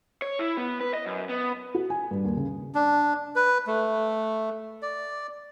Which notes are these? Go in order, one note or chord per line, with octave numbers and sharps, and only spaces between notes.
C#5
E4
B3
B4
D#5
F#2
B3
F#4
G#5
G2
D#2
C#3
D4
B4
A3
D5